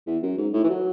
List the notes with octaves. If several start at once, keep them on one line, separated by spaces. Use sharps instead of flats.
E2
F#2
G#2
A2
E3
F#3